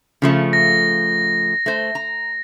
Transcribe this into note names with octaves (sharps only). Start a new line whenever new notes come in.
C#3 F3 A3
A#6
A3 C5
A#5